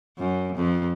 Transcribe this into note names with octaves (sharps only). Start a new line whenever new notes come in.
F#2
F2